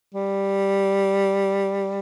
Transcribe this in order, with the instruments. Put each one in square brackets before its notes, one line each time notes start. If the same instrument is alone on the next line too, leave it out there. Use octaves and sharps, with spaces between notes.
[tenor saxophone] G3